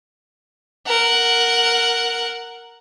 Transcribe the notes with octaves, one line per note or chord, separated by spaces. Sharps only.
A#4 F#5